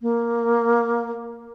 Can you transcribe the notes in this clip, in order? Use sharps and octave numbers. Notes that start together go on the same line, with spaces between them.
A#3